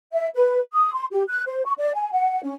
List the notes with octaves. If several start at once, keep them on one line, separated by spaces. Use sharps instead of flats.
E5
B4
D#6
C6
G4
F#6
C5
C#6
D5
G#5
F#5
C#4